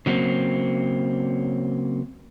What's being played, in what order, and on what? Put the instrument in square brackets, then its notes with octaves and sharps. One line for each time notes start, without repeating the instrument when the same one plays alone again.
[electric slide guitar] C#3 F#3 A#3 C4